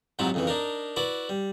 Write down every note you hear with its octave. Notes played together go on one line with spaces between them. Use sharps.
G#2 C3 F#3 E4 F4
F2 C#3 E3
D4 D#4 A#4
E4 F#4 B4 D5
G3